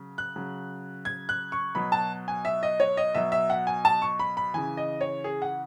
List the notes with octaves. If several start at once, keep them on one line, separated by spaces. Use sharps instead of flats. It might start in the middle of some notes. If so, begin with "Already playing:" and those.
Already playing: C#3 F#3
F#6
C#3 F#3
G#6
F#6
C#6
B2 F#3 B5
A5
G#5
E5
D#5
C#5
D#5
B2 F#3 E5
E5
F#5
G#5
A5
C#6
B5
B5
C#3 E3 G#5
D#5
C#5
G#4
F#5